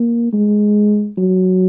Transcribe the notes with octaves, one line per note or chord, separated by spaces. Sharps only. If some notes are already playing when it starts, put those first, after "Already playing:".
Already playing: A#3
G#3
F#3